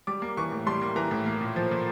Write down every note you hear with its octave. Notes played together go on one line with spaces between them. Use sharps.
G3 D6
A#3
E3 C#6
A2
G3 C6
A#3
E3 A#5
A2
A#3
A#2
F3
A#2